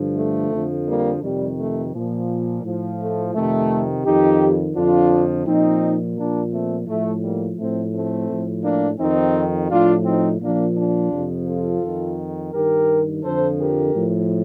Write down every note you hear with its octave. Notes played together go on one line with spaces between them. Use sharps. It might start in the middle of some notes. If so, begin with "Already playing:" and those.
Already playing: G2 D3 F3
A3
F2 D3 F3
G3 A#3
F2 C3 D#3 G3
A3
A#2 F3
A2 F3
A3
F2 C3 D#3 A3
F2 D#3 D#4 G4
F2 D3 F3 D4 F4
A#2 F3 C4 D#4
A#2 F3 A#3 D4
A3 C4
A2 F3 A3
G3 A#3
A2 F3 A3 C4
A3 C4
A2 F3
A#3 D4
F2 D#3 C4 D#4
A2 F3 D4 F4
C4 D#4
A#2 F3 A#3 D4
D4 F4
F2 C3 F3
F4 A4
F2 D#3
G2 D#3 G4 A#4
F2 D3 F3 A4 C5
G4 A#4
A2 F3